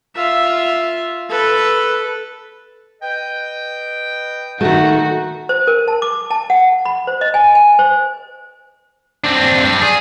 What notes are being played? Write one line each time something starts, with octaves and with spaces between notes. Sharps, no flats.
F4 E5
A4 B4
B4 D#5 G5
D#3 A3 F#4
C5
A#4
A5
D6
A5
F#5
B5
C5
D#5
G#5
G#5
C5
C4 D4
G3 D4
G#4